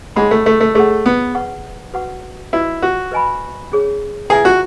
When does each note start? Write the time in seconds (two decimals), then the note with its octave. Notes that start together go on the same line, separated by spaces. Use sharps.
0.16 G#3 D#4 G#4 C#5 F#5 B5
0.31 A3
0.46 A3
0.60 A3
0.75 A3 G#4 C#5 F#5
1.06 B3
1.35 B4 F#5 C#6
1.94 F#4 B4 F#5 C#6
2.53 E4 F#4 B4 D#5
2.82 F#4
3.12 B4 D#5 G#5 B5
3.72 C#4 G#4 C#5
4.30 E4 G#4 B4 E5 G#5
4.45 F#4